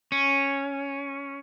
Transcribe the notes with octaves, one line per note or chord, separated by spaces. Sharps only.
C#4